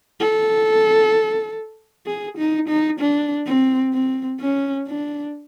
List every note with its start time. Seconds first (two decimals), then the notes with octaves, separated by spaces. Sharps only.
0.20 A4
2.07 G#4
2.37 D#4
2.68 D#4
3.00 D4
3.46 C4
3.93 C4
4.40 C#4
4.87 D4